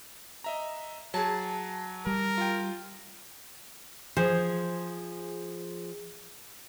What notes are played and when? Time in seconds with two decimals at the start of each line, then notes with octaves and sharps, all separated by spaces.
0.44 D#5 E5 A#5
1.14 F#3 G#4 A5
2.07 G3 A#4
2.38 F4 G5
4.17 F3 G#4 C5